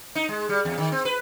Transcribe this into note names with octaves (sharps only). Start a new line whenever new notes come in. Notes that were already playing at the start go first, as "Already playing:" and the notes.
D#4
G#3
G3
E2
D#3
C4
B4